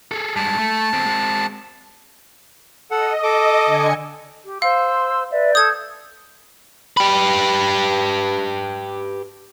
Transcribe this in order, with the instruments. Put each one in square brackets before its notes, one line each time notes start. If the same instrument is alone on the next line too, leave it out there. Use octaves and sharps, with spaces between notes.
[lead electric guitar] G#4 A4
[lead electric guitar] G2 G#3 [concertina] A5
[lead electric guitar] A3
E2 C4
G#3 C4
[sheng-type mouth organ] A4 F#5 [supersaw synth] D#5
[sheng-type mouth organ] A4 D6
[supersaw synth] D3 G#5 C#7
[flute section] G4
[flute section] C5 C6 E6 [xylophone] F5
[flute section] B4 D5 E5
[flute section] A4 G6 [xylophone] D#6 G#6
[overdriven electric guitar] G4 B4